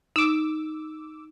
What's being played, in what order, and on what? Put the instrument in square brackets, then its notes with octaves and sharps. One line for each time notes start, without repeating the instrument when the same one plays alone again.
[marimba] D#4 [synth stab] D6 E6